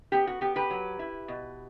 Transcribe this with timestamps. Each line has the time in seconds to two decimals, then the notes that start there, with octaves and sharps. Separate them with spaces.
0.12 B3 G4
0.27 F#4
0.41 B3 G4
0.56 G4 B4
0.70 F#3
0.99 E4
1.28 B2